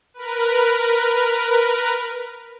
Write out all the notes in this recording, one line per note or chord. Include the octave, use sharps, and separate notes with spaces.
A#4 B4